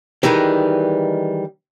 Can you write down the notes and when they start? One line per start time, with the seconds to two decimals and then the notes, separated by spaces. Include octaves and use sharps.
0.23 D#3 E3 G3 G#3 D#4